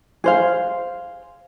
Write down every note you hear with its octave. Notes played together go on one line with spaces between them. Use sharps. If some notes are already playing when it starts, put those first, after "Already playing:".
G#4 C5 F5